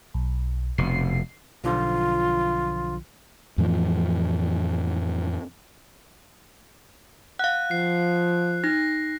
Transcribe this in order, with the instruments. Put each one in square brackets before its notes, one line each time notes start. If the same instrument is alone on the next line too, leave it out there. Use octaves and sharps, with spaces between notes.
[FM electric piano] B1
[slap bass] F1 B2 [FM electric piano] C7
[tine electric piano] B1 D3 F3 [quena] F4
[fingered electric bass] F2 A2 E3 F3
[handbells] F5 F#5 [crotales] F#6
[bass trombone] F3 [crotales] C7
[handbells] D#4 [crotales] A#6